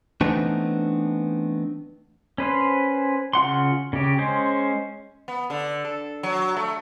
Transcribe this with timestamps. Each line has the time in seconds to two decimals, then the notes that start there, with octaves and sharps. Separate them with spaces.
0.21 E3 A3 B3 C4 D4 D#4
2.38 C#4 B4 C5
3.33 C#3 F4 F#5 C6
3.93 C#3 G4
4.18 G#3 C#4 C5
5.28 B3
5.50 D3
5.85 A4
6.23 F#3
6.56 A3